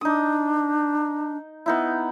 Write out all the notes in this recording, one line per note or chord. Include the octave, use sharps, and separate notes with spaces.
D4 D#4 D#6
B3 D#4 E4